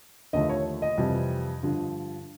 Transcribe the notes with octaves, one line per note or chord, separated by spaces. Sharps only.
D#2 D3 F3 A3 D#5
C#5
D#5
F2 C3 E3 G3
G2 D3 F3